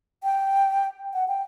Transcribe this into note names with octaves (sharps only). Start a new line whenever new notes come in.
G5
F#5
G5